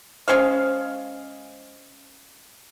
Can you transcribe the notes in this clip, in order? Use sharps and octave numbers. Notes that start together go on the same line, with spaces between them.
G#3 C#4 C5 F5